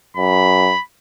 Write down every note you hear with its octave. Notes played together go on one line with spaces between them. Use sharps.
F#2 B5